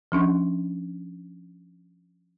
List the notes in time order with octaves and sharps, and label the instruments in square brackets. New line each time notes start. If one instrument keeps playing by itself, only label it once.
[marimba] F3 C#4 D4